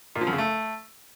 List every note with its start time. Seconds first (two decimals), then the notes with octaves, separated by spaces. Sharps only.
0.16 A#2
0.21 F3
0.27 F#2
0.33 C#3
0.38 A3